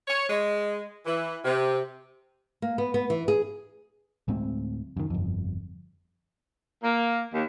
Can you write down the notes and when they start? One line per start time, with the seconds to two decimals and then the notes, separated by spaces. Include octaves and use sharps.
0.08 C#5
0.30 G#3
1.06 E3
1.45 C3
2.62 A#3
2.78 B3
2.94 B3
3.10 E3
3.28 G#4
4.28 D1 A2 G#3 C4
4.97 F#2 D#3
5.10 G1 F2
6.82 A#3
7.33 D#2